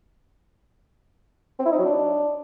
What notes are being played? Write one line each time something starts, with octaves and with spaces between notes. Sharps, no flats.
C4
E4
D#4
F#3
D4